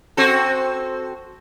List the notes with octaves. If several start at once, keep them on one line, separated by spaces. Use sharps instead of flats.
C4 F#4 A4